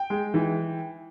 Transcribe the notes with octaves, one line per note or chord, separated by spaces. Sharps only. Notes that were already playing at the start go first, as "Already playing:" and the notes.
Already playing: G5
G#3
E3